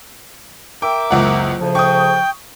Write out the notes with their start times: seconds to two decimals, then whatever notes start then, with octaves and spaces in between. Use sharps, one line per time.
0.82 A#4 E5 G5 D6
1.11 F#1 C#2 F#5
1.60 D2 C#3 F3
1.75 G5 C#6 D#6